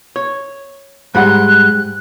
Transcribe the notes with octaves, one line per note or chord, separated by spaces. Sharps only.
C#5
G#2 G3 F#5 F#6